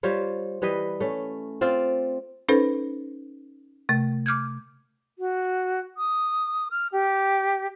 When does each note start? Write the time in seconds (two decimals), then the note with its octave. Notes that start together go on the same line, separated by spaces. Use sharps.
0.03 G3 F4 C5 C#5
0.62 E3 G3 B4 D#5
1.00 A3 C#4
1.61 C4 F4 D5 F5
2.49 C#4 D#4 A4 B4 C5
3.89 C3 A3
4.26 D6 F6 G6 G#6
5.19 F#4
5.97 D#6
6.71 F6
6.92 G4